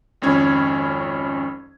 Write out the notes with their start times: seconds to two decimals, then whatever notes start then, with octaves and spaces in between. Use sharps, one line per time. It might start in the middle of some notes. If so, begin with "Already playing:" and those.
0.22 G#1 F2 C#4 G#6